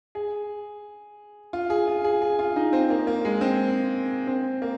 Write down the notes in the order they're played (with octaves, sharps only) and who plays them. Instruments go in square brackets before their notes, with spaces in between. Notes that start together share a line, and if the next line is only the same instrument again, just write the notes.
[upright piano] G#4
F4
G#4
F4
G#4
G#4
F4
D#4
C4
A#3
A#3
G#3
C4
C4
A#3